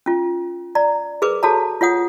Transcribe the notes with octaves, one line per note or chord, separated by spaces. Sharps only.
C#4 F4
D5 A#5
G#4 A#4 B4 D6
F#4 G#4 A4 C#5 A5 A#5
F4 C#5 F#5 D#6